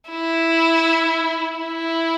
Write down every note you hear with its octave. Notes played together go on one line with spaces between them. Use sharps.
E4
E4